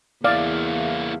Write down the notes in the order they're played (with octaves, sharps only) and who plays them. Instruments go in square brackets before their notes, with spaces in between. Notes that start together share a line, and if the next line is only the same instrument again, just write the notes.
[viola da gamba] E2 [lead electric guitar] A#3 E4 [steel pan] D5 [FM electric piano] F5